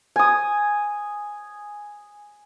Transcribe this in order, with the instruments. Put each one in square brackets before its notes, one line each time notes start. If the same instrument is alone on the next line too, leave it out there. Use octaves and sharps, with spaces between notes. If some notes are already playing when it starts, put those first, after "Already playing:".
[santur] G#5 D#6